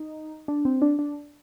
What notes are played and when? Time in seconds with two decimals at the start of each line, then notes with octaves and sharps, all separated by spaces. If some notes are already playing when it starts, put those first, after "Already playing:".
Already playing: D#4
0.48 D4
0.65 C4
0.82 D4
0.99 D4